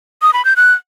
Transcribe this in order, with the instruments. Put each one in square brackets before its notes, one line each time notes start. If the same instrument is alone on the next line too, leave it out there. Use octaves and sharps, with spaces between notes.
[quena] D#6
B5
G6
F#6